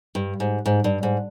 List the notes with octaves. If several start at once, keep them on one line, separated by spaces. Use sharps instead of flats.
G2
G#2
G#2
G2
G#2